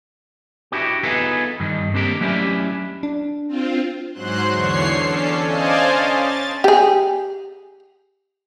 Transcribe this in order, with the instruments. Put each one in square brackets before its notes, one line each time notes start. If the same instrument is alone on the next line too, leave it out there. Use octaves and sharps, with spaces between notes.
[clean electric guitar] D4 E4 F#4 G4
B3 D#4 F4 G#4 A4 B4
G2 D#3
A#3 C4 D4 G4 A#4
F#3 A3 C#4 D4 E4 G4
[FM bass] D4
[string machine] C4 F4
[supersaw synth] G#2 F#3 C5 C6 F#6
E2 D3 C#5 C7
C#4 D4 A4
C5 D5 D#5 F5 G#5 A5
C#4
A6
[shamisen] G4 G#4